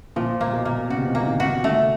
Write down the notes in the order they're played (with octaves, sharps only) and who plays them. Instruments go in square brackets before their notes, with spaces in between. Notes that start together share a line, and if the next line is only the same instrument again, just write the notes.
[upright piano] A#2 [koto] F3
[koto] A#3
[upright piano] B2
[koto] A#3
[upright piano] C#3 [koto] F#4
[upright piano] C3
B2
C3
[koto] A#3
[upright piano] D#3
[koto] F#4
[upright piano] C#3 [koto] A3